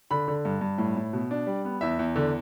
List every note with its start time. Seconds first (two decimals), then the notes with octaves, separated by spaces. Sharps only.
0.11 D3 B5
0.28 D3
0.45 G2
0.61 G2
0.78 A2
0.96 A2
1.13 B2
1.31 D4
1.47 G3
1.65 B3
1.81 E2 E5
1.99 E2
2.16 D3